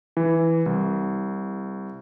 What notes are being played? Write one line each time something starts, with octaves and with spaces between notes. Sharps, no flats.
E3
C2